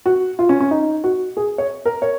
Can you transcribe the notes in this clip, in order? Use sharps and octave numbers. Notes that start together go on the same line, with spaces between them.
F#4
F4
C#4
C#4
D#4
F#4
G#4
C#5
A#4
C#5